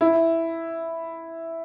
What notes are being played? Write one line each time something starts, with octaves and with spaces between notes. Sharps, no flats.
E4